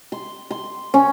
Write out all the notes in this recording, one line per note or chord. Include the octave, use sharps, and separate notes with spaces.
C6
C6
C#4